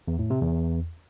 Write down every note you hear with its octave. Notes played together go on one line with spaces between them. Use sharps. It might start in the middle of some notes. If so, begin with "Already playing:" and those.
E2
A2
C3
E2